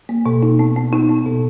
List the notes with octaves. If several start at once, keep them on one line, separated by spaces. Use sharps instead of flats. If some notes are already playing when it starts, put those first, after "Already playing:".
A#3
B2
D#4
B3
B3
D#4
B3
B2